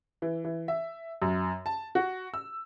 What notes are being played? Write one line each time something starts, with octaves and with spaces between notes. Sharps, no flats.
E3
E3
E5
F#2
A5
F#4
E6